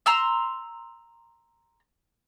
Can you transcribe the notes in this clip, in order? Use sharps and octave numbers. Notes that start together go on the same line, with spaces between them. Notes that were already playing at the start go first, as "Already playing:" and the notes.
A#5 C6 E6